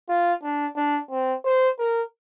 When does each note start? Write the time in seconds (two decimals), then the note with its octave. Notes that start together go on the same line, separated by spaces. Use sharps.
0.09 F4
0.43 D4
0.76 D4
1.11 C4
1.44 C5
1.79 A#4